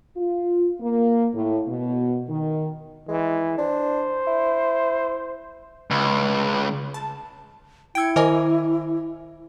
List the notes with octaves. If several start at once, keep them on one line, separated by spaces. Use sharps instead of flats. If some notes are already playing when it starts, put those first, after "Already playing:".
F4
A#3
A2
B2
D#3
E3 G#3
D4 C5
E4
C#2
A5
E4 G5 E6 G#6 C#7 D7
D#3 A#4 C5 D#5 G#5 D6